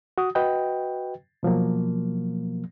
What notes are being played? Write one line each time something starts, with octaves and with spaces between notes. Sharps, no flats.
F#4 D#6
F#4 B4 D#5 G5
B2 F3 F#3 A#3